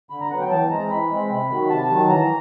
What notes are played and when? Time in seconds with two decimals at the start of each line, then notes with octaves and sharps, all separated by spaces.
0.10 D3 B5
0.21 A#5
0.30 F#3 B3 F#5
0.41 G5
0.50 E3 A5
0.70 G#3 C4 A#5
0.90 E3 B5
1.10 G#3 C4
1.30 C3
1.50 D#3 F#3
1.69 C3 A5
1.90 D#3 F#3
2.09 E3 A#5